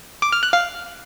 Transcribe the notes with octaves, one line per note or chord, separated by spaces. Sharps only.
D6
F6
F#6
F5